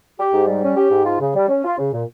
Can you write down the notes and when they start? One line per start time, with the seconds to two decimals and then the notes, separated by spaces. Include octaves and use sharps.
0.19 G4
0.33 G#2
0.47 G3
0.63 C#4
0.77 G4
0.91 G#2
1.05 F4
1.20 C#3
1.35 G3
1.49 C#4
1.65 F4
1.78 C#3
1.93 A#2